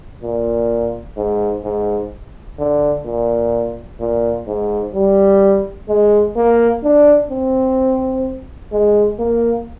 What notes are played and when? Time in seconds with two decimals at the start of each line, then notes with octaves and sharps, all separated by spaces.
0.22 A#2
1.17 G#2
1.64 G#2
2.59 D3
3.06 A#2
4.00 A#2
4.47 G#2
4.95 G3
5.89 G#3
6.36 A#3
6.84 D4
7.31 C4
8.72 G#3
9.19 A#3